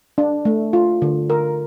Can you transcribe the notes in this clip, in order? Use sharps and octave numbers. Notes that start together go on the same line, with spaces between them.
D4
A3
F4
D3
A#4